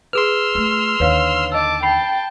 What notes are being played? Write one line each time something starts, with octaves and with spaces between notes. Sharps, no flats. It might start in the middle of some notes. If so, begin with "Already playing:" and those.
G#4 B4 C6 E6 F6
A3 F4
D#2 D3 B4 C#5 F5
D#5 A5 D6 E6
G5 A5 B5 C7